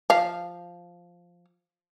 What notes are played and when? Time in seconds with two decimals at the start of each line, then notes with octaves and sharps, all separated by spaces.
0.10 F3 F5